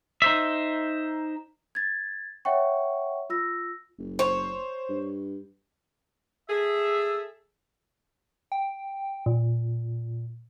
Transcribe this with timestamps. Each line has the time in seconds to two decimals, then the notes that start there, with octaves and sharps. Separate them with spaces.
0.22 D#4 C5 E5
1.75 G#6 A6
2.45 C#5 E5 F#5 G5 C#6
3.30 F4 E6 A#6
3.99 F#1
4.19 C5 C#5
4.89 G2
6.48 G#4 A4 E5
8.52 G5
9.26 A#2